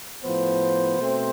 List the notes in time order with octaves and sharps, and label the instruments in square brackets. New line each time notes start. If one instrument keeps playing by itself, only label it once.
[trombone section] A2 F3 B3 C5
B2 A3 C4